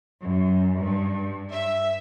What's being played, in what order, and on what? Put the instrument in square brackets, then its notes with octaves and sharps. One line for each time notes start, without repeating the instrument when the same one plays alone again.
[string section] F#2
G2
E5